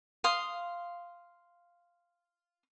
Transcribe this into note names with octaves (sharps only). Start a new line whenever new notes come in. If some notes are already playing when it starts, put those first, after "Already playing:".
F5 C6 D#6